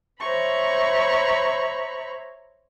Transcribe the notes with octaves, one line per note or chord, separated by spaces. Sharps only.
C5 C#5 E5 A#5 B5 C#6